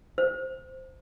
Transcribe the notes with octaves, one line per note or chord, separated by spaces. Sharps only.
C5